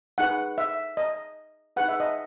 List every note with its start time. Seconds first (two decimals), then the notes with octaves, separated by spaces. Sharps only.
0.18 D#4 G#4 B4 F#5
0.58 E5
0.97 D#5
1.76 D#4 G#4 B4 F#5
1.88 E5
2.00 D#5